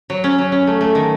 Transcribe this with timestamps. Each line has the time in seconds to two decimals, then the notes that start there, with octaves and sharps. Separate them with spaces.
0.10 F#3
0.24 C#4
0.38 F#3
0.52 C#4
0.67 A3
0.81 A3
0.95 D#3